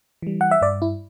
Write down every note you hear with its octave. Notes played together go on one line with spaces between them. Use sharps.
E3 G3
F#5
E5
G2 D5
E4